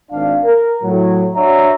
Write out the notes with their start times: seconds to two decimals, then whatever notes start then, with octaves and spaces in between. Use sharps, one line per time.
0.11 G#1 D4 F5
0.44 A#4
0.83 A2 F#3
1.35 D4 F#4 C#5 E5 A#5